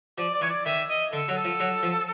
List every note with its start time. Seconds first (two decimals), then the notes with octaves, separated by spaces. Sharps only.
0.18 F3 D5
0.34 D5
0.41 E3 C#5
0.50 D5
0.65 D#3 E5
0.89 D#5
1.13 D3 A4
1.28 F#3
1.37 A4
1.45 F3
1.60 F#3
1.83 F3